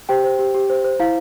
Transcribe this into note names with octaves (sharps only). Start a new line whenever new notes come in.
G4 C5 G5
C5
G4
G4
C5
C5
E4 F5